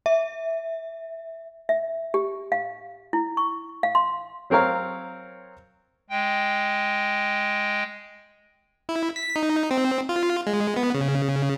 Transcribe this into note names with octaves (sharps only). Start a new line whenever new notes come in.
E5
E5
G4
F5
E4
C#6
F5
C6
F#3 C4 A#4 C#5 F5
G#3 G5
E4
B6
D#4
C4
F4
G#3
B3
C#3